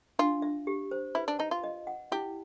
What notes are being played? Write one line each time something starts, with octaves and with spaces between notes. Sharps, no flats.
D4 F4
E5
G4
C5
E4 B4
D4
D#4 A5
F4
D#5
F#5
E4 G4